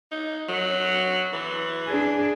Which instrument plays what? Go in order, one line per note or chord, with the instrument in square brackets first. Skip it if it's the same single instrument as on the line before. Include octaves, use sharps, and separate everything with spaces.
[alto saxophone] D#4
F#3
E3
[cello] D4 G#4